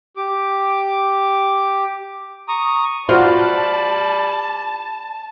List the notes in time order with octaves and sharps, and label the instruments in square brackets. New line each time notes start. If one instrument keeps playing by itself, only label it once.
[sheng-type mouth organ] G4 D6
A#5 C#6 D#6
[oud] F4 [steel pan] F#4 C5 [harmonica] D5 B5 [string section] A5